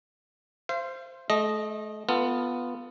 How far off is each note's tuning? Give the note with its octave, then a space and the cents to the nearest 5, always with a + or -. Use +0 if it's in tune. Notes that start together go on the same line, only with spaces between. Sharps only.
C5 +0 F5 -40
A3 -35 D#5 -5
B3 +0 F4 +0 A4 +30